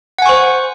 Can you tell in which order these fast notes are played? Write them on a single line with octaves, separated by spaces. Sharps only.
F#5 G#5 C#6 C5